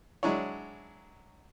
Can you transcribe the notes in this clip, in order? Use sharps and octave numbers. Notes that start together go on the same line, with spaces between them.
F#3 G#3 D4 E4 C#5